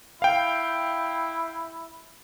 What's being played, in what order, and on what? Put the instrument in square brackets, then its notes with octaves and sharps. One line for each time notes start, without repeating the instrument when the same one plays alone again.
[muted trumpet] E4 [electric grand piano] F5 G5